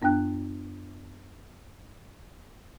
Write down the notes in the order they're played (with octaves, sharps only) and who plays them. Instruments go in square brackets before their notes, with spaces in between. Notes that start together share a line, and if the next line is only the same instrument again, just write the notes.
[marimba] F#2 B3 D4 G5 F#6